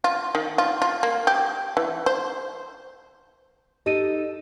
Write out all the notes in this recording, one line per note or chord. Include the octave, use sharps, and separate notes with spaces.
F4
D#3
F4
F4
A#3
G4
E3
C5
D#4 G4 A4 D#5 D#7